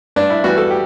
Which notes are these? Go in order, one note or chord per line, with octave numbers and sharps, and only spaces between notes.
G2 D4
E4
E3 G3 B3 F#4
A4
G4